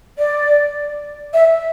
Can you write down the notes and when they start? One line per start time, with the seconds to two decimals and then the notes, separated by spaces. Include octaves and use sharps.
0.19 D5
1.34 E5